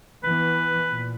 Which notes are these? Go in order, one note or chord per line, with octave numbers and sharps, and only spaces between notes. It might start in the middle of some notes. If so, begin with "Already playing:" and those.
E3 B3 B4
A#2